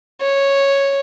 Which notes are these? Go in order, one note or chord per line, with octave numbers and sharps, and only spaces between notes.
C#5